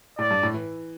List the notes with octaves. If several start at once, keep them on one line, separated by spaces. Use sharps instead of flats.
A2 D5
G2
A2
E3